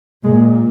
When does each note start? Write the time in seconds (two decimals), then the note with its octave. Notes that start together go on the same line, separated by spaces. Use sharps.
0.24 A#2 G#3